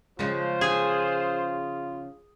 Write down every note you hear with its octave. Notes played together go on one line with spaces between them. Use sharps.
C#3 F3 G#3 F4 C5
G#4